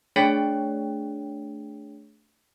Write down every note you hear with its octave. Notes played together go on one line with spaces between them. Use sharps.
A3 D4 G#4 C#5 G5 A6